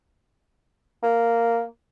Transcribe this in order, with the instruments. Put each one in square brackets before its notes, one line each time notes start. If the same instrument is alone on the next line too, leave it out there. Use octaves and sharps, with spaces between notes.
[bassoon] A#3